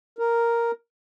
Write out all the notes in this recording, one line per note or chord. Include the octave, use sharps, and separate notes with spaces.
A#4